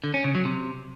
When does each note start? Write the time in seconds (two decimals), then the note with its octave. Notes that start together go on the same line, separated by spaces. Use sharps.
0.04 D3
0.14 C#4
0.24 C#3
0.35 F#3
0.45 C3